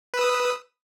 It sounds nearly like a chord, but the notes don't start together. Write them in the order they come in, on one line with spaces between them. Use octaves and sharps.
B4 E6 D#6